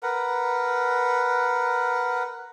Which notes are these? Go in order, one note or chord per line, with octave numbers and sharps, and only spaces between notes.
A#4 B4 F#5